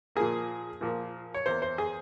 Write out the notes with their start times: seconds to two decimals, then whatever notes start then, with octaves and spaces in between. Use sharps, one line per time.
0.16 A#2 F3 A#3 G#4
0.81 A#2 F3 A#3
1.34 C#5
1.46 E2 E3 A#3 C5
1.62 C5
1.78 G#4